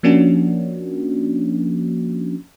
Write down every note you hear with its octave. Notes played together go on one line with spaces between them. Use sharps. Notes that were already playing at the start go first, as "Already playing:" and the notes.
F3 A#3 C#4 D4 F#4